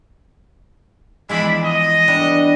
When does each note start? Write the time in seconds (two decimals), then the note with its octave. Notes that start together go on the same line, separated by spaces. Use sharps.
1.29 E2 F3 G#3 D4 E4 B5
1.65 D#5
2.08 G3 B3 D4